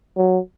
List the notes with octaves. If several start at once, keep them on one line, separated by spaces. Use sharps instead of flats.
F#3